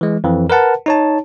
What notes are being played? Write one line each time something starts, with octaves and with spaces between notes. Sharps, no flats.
E3 G#3
F2 E3
A#4 B4 F#5 A5
D#4 C#5 A5